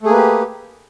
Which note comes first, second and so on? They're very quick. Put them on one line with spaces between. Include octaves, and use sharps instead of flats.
A3 G#4 A#3 B4 G4